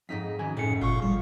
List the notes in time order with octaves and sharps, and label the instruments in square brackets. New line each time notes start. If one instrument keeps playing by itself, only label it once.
[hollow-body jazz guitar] F2 D#4 [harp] G#2 D#5 B6
[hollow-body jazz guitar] F#2 D#3 G#5
[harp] F#1 [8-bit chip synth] A2 C#7 [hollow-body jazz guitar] C#3 A3 G#4
[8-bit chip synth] G1 A#2 C#6 [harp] F4
[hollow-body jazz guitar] F3 [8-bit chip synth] G3